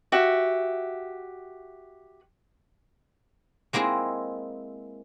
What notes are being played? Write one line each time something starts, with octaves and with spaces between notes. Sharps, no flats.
F#4 G4 E5
G#3 A#3 C4 E4 G#4